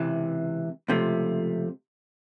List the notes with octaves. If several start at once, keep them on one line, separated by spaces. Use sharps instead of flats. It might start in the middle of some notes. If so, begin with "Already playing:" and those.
Already playing: C#2 C3 E3
C#2 C3 F3 A3